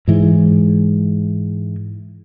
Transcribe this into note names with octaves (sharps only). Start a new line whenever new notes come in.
G#2 E3 G#3